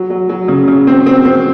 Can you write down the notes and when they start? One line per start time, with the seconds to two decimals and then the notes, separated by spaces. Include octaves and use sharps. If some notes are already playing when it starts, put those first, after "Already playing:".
Already playing: F#3
0.10 F#3
0.29 F#3
0.48 C#3
0.68 C#3
0.87 C4
1.06 C4
1.25 C4